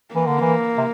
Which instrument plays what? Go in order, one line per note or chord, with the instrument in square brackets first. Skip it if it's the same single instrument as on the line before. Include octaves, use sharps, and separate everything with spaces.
[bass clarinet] E3 [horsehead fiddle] A#3
[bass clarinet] D3
E3
C3